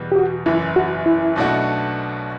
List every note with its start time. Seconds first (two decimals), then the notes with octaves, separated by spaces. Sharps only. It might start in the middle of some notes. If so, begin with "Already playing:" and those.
Already playing: E2 B2 G3 B3
0.12 G4
0.16 F#4
0.46 F#1 F#2 E3 E4
0.76 F#4
1.06 E4
1.36 B1 B2 A3 D4 F#4